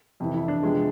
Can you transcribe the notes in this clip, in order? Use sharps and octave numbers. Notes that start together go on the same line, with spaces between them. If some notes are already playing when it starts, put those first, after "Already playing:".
F2 C3 E3
E4
D4
C3 F3 G#3 B3